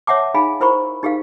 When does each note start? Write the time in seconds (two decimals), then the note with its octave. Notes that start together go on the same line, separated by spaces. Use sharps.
0.07 C#5 E5 F#5 A5 D6
0.34 D#4 G#4 F5 G#5 B5
0.60 E4 A#4 C5 B5 C#6
1.03 D#4 G4 G#4 A#4 F5